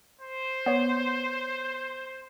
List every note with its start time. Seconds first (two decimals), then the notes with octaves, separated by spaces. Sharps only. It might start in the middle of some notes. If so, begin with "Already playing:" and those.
0.21 C5
0.66 B3 C#5